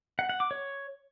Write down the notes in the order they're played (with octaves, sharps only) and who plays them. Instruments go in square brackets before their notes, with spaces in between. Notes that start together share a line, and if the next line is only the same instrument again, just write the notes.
[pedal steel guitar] F#5
F#5
D6
C#5